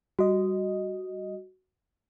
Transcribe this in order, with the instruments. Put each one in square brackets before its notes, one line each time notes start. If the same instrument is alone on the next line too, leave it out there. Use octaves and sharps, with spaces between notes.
[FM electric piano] G3 D#5 [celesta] F#4